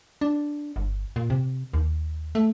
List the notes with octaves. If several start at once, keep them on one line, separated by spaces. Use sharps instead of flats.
D4
G1
A#2
C3
D#2
A3